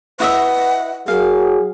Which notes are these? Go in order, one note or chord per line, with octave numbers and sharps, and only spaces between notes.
E4 B4 D#5 E5 F#5
F#3 G#4 A#4 F5